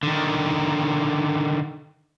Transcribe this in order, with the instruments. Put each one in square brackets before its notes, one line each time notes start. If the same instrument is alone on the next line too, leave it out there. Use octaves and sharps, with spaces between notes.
[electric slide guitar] D3 D#3